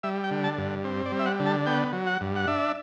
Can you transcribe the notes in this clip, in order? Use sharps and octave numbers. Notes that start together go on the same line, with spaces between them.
G3 E5
G5
D3
A5
G2
C4
D5
G3
E5
F#5
D3
A5
B3 G5
F#3
F#5
G2
F#5
D4 E5